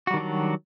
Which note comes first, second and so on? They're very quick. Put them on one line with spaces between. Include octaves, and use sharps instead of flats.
F#4 G3 D#3 D4 F#3